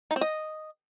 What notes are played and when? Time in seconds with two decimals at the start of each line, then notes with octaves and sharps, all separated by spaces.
0.11 D#4
0.16 C4
0.21 D#5